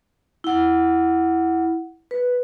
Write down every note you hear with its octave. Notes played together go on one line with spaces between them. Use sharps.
E4 F#5
B4